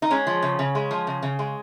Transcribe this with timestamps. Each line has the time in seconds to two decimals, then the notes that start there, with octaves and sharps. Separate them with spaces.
0.02 D#4
0.10 G#3 C#4
0.27 F3
0.42 C#3
0.59 C#3
0.75 G#3
0.91 F3
1.07 C#3
1.22 C#3
1.39 G#3